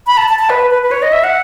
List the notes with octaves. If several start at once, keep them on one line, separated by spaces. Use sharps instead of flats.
B5
A5
A5
A5
B4
B4
B4
C#5
D#5
E5
F#5